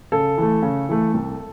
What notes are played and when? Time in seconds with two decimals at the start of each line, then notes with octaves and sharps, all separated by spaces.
0.12 C#3 A4
0.38 E3 A3
0.62 C#3
0.89 E3 A3
1.14 C2